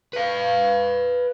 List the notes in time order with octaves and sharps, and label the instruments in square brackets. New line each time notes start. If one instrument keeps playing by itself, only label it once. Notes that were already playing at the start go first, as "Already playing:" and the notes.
[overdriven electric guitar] B4 F5